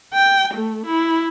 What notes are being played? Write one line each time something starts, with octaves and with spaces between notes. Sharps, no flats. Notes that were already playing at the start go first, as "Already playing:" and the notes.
G5
A3
E4